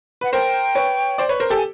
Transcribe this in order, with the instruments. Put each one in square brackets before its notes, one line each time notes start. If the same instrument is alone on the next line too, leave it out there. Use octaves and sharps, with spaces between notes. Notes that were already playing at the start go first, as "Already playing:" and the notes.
[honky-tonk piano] B4 [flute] F#5
[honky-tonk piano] A#4 C5 [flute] G5
[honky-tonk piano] B4 C#5
C5 D5
B4 C#5
A#4 C5
G4 A4
[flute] G#5